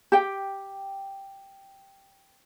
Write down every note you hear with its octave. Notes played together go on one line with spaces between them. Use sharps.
G4 G5